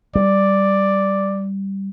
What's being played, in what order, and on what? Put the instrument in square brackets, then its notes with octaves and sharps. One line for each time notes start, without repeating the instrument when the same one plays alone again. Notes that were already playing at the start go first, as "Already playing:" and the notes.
[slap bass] G3 [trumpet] D5